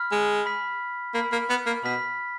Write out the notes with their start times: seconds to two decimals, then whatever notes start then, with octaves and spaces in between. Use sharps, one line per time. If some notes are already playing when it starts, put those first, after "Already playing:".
Already playing: B5 F6 B6
0.12 G#3
0.46 B5 F6 B6
1.15 A#3 B5 F6 B6
1.32 A#3
1.50 B3
1.66 A#3
1.83 B2 B5 F6 B6